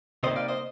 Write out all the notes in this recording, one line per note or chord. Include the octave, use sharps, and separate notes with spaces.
C3 G3 A#3 D#4 C5 D#5
D5 F5
C5 D#5